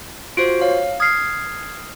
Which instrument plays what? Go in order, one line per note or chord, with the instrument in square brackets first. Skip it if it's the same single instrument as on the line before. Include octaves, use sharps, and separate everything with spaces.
[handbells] F4 F#4 C5 [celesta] D7
[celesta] C#5 [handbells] F5
[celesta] D#6 F6 C7 [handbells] G#6